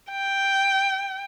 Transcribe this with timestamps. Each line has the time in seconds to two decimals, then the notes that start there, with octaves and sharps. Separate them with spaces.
0.11 G5